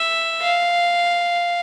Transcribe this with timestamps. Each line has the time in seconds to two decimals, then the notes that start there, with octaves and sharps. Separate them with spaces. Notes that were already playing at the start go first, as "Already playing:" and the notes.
Already playing: E5
0.41 F5